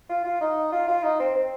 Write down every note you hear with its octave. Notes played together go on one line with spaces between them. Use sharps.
F4
F4
D#4
F4
F4
D#4
C4
C4